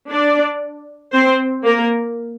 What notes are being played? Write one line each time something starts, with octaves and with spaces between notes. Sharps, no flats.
D4 D5
C4 C5
A#3 A#4